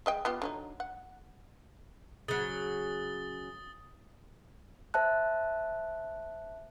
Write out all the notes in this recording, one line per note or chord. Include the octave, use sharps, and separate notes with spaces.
G#3 D#5 G5
B3 F4 G4
D3 F#3 D#4
F#5
C#3 F#3 D#6 A6 G7
C5 E5 A5 F#6